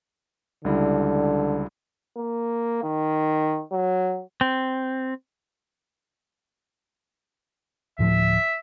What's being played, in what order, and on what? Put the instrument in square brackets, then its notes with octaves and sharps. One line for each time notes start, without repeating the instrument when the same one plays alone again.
[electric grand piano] C#2 G3 E4 [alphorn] D3
[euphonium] A#3
D#3
F#3
[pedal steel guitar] C4
[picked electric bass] D2 A2 F3 [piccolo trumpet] E5